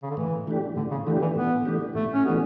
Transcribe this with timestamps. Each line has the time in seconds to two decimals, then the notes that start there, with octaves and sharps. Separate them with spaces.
0.03 C#3
0.10 D3
0.17 A2 E3
0.47 E3 A3 D4 G4
0.76 A2 D3
0.91 C#3
1.07 D3 E3 A3 D4 G4
1.22 E3
1.36 A2 B3
1.66 E3 A3 D4 G4
1.95 A2 A3
2.13 C#4
2.25 E3 A3 B3 D4 G4